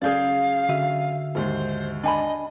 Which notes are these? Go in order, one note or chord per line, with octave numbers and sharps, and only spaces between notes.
F#2 C#3 G#4 D5 F5 G6
D3 F#4 E5
D#2 G#2 C5
D4 D#5 G#5 B5